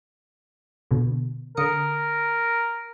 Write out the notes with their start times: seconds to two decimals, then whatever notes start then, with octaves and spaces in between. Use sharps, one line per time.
0.91 B2 D3
1.57 D3 A#4 D#6 C#7